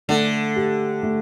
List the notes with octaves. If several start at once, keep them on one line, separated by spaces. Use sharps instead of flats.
D3 A3
G4
A3